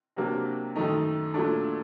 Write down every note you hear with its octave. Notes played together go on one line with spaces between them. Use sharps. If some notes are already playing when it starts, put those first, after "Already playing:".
C3 F#3 A#3 D4
F#2 D#3 A3 D#4
A#2 F#3 A3 D4